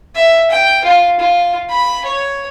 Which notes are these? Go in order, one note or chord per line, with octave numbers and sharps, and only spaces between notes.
E5
G5
F4
F4
B5
C#5